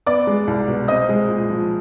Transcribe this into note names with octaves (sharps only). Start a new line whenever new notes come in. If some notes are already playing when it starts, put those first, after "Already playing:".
B3 D5 D6
G#3
C2
B2
C4 D#5 D#6
G#3
A#2
F3